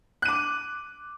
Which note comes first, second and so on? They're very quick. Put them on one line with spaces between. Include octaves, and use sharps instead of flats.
F#6 D#7 D6